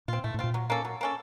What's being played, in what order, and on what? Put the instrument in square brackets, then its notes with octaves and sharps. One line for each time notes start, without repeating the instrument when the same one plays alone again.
[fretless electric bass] A#2 [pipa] C4 F4
[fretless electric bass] A2 [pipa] A3
[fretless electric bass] A2
[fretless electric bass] A#2 [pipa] C4 F4
[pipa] F#3
A#3 C#4 A4
F#3
A#3 C#4 A4